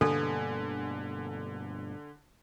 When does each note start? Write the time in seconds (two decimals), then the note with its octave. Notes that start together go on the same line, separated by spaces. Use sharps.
0.01 G2 B2 D3 A#3 A4 G#5